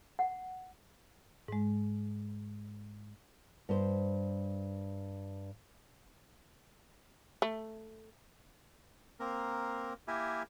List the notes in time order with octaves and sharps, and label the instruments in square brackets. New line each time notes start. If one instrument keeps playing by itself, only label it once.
[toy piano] F#5
[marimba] G#2 G#3
[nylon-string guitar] G2 C5
[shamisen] A3
[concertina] A#3 C4 A#4
A#3 E4 G4 A#4 E5 G#5